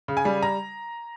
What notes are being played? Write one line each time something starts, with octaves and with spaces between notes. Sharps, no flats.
C#3
G#5
G3
A#5